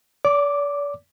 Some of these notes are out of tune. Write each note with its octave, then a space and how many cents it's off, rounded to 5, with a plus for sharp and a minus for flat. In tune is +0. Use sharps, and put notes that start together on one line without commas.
D5 -40 D6 +0